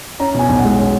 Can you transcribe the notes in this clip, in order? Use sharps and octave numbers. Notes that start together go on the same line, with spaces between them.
C#4 A#5
B2 G#5
B1
F#5
G#3
C#4